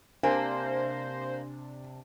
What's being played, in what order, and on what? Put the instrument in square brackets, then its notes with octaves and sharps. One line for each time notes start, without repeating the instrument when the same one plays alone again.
[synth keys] C3 D4 [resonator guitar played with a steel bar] A#3 [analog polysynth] C5 [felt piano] G#5